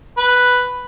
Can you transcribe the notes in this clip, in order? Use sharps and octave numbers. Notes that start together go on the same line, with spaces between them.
B4